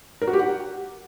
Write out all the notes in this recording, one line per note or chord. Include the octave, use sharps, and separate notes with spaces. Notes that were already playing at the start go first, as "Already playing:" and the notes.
A#4
F#4
G4
F#5